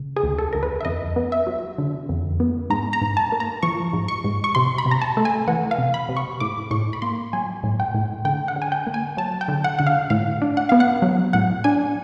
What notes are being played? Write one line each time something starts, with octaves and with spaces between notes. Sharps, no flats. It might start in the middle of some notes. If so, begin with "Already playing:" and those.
Already playing: C#3
G#4
D2
A4
D2 A#4
B4
E5
F2 D#5
B3
E5
F#3
D3
F2
B3
G#2 A#5
A#5
G#2
A5
A#3
A#5
F3 C#6
G#2
C#6
G#2
C#6
C3 C6
B5
C3
A#5
A5
A3
G#5
E3 F#5
F5
C3
B5
C3
C#6
A2 D6
A2 C#6
B5
A#3 C6
F#3 G#5
A2
G5
A2
D3 G5
F#5
D3
G#5
G5
A#3
G#5
F#3 A5
G5
D3
F#5
D3 F#5
F5
A2 F5
D4
F#5
B3 F5
F#5
F#3
A2 F#5
D4 G#5